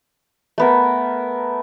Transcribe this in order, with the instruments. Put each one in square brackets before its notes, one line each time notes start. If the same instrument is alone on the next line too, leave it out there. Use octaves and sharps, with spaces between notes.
[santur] A3 B3 A#4